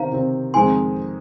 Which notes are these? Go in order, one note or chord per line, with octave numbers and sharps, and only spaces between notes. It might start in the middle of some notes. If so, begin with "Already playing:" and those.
Already playing: C3 D#3 C4 F5 A#5
C3 D#3 C4
F2 D#3 G#3 C4 D#4 G#5 C6